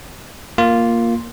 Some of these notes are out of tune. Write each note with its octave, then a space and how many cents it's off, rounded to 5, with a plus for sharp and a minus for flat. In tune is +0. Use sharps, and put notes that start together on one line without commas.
A#3 +0 F4 +0